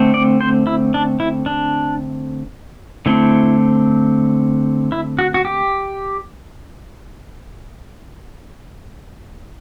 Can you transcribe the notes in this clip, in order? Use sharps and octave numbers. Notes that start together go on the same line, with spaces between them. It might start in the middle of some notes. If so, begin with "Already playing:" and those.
Already playing: D3 A3 C4
D5
C5
E4
D4
E4
D4
D3 A3 C4 E4
E4
F#4
F#4
G4